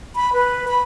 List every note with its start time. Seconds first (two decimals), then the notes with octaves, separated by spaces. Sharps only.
0.16 B5
0.33 B4
0.68 B5